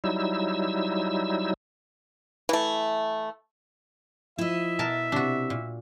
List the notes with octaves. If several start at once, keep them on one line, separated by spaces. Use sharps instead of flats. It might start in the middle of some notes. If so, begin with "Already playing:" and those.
F#3 G3 D#4 E4 E6
E3 A3
F3 E4 D#5 E5
B2 A#4 A5
C3 D4 F#4
A#2